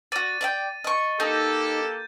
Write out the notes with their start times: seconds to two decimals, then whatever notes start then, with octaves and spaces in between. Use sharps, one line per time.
0.12 F#4 D5 A6 D#7
0.41 D5 E5 G5 A6
0.84 D#5 C#6
1.20 A#3 D#4 G4 A4 G6